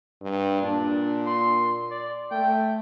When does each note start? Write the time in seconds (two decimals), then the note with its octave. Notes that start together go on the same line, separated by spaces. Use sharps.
0.22 G2
0.62 A#2 D4
1.27 C6
1.91 D5
2.31 A3 G5